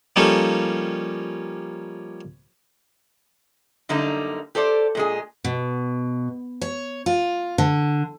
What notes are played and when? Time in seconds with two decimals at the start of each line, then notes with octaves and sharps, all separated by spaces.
0.16 F3 G3 A#3 C#4 D#4 A4
3.89 F#2 D3 G3 A#3 D#4
4.55 G4 A4 C5 D5
4.95 A#2 G#3 G#4
5.44 B2
6.61 C#5
7.06 F4
7.58 D3